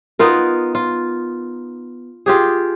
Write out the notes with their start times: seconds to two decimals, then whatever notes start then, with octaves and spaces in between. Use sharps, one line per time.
0.19 B3 D#4 F4 A#4
0.75 F4
2.26 F4 G4 G#4